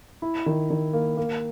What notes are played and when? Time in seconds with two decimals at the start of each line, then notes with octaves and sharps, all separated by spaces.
0.22 E4
0.46 D#3
0.70 D#3
0.93 A#3
1.17 A#3